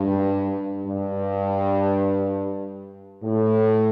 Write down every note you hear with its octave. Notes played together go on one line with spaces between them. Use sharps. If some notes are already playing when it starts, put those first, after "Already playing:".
Already playing: G2
G2
A2